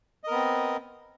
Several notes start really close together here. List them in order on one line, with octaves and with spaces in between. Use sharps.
D#5 A#4 B3 C4